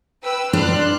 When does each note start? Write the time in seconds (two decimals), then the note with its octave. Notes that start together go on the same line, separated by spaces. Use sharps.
0.24 B4 G5 E6
0.53 D4 C6 F6 F#6